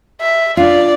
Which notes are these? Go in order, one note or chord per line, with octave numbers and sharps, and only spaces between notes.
E5
D4 F4 D5